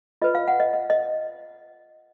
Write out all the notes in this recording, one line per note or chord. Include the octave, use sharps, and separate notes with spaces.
F4 B4 D#5
F5
F#5
D#5
D#5
D#5